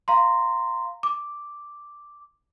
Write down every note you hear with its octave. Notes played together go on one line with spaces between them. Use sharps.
F5 A#5 C6
D6